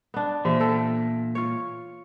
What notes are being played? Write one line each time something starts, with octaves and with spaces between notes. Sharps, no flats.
B3 D4
A#2 E3 E5
A4 G5
F4 C#5